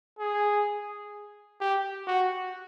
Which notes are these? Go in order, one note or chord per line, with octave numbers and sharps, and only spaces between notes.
G#4
G4
F#4